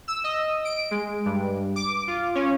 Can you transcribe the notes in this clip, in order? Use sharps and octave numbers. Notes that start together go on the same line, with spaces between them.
E6
D#5
D7
G#3
G2
D6
F4
C#4